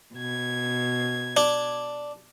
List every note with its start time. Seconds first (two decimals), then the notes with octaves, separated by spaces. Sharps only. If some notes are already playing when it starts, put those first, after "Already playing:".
0.15 B2 G#6
1.37 D4